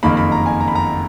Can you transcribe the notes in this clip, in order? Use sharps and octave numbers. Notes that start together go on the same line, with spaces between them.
F#1 F2 D#3 A#3 B5
B5
A#5
G#5
A#5
B5
A#5